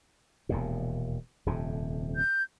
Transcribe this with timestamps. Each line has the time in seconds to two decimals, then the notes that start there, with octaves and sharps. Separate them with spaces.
0.49 E1 D#2 A#2
1.46 D#1 F2 C3
2.16 G6